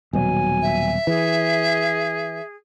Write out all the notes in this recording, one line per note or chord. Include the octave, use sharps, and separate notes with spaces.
D#1 B2 F#3 G#5
E5
E3 G#4